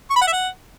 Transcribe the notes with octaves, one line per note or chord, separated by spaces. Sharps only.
C#6
B5
F#5
E5
F#5